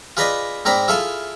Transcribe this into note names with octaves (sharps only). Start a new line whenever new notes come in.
F4 G#4 B4 D5 D#5 B5
G#2 C4 A#4 D5 B5
E4 F4 G#4 A4 F5